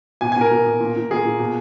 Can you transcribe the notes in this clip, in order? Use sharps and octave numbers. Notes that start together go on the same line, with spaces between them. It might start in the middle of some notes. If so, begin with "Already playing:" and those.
B2 G#5
G#5
B2 A#4
B2
B2
A#2
A#2
A#2 G#4
A#2
B2